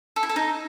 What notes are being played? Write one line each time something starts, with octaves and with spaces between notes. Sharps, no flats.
A4
E4
A4
D#4